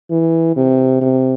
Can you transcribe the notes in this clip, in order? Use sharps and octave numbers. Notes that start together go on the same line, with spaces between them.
E3
C3
C3